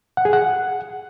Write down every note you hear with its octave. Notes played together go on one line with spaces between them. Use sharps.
F#5
G#4
F#5